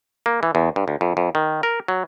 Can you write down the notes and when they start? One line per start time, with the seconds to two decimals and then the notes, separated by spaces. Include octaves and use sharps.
0.26 A#3
0.43 E3
0.55 E2
0.76 G2
0.88 D2
1.01 F2
1.17 F2
1.35 D#3
1.63 A#4
1.88 F#3